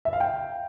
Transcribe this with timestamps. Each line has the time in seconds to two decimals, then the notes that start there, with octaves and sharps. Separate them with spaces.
0.05 E5
0.13 F5
0.20 G5